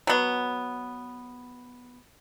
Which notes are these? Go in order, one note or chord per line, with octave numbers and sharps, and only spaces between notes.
F#3 B3